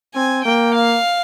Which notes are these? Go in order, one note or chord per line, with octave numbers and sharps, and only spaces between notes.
C4 G#5
A#3 G5
F5